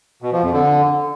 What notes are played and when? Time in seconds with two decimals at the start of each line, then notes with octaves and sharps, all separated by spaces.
0.22 B2
0.32 F3
0.42 F2
0.53 D3